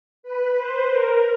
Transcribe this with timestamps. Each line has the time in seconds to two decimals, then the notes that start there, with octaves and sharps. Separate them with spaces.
0.23 B4
0.57 C5
0.90 A#4